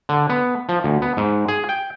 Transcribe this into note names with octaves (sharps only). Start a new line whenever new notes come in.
D3
B3
F3
D2
B3
G#2
G#4
G5